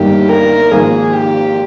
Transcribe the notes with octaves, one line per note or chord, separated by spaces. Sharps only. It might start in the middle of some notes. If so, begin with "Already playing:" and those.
Already playing: G1 G2 D#3 A#3 D#4 G4
A#4
G#1 G#2 F3 A#3 G#4
G4